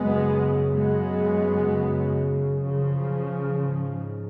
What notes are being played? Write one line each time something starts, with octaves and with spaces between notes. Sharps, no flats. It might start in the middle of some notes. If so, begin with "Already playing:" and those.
Already playing: F#2 C#3 G#3 B3
G#3 B3
C#3 F3
G#2